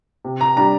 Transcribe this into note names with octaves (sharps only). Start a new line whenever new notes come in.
C3
A#5
G3 D4 A#5